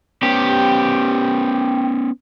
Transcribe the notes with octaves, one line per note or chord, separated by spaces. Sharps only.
B3 C#4 G4